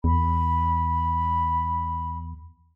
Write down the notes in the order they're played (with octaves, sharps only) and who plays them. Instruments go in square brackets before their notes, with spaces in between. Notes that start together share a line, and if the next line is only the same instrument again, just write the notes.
[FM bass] E2 [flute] B5